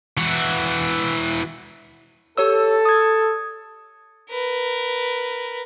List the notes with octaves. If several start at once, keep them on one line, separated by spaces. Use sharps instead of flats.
E3 F#4
G4 A4 C#5 E6
D#6 G#6
A#4 B4